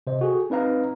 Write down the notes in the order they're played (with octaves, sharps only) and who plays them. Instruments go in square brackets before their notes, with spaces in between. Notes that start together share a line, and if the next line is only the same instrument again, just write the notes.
[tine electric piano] C3 C5 D#5
F#4 G#4 A4
C4 D#4 B4 F5 A#5